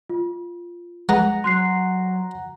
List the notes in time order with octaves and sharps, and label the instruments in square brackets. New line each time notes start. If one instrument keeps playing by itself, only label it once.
[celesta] F4
[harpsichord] G#3 B3 [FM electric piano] F#5 A#5
[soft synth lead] F#3 [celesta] C6 F#6 C7